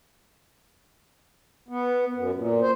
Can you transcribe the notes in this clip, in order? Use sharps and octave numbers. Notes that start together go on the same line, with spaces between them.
B3
F#2
A#2
C5